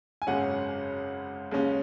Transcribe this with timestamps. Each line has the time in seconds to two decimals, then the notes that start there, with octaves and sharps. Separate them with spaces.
0.22 G#5
0.27 G#1 F#2 C#3 G#3 C#4 F#5
1.52 D#2 C#3 G#3 C#4